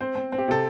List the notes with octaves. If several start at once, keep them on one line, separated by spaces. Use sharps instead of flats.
C4 C5
C4
C4
G4
C3 A4